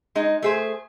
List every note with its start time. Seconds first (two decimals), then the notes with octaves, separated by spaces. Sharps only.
0.15 G#3 D#4
0.42 A3 G#4 C5